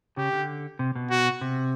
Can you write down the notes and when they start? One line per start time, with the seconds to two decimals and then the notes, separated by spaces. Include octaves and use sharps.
0.17 C#3 G4
0.33 D3
0.79 C3
0.96 B2
1.10 F#4
1.41 C3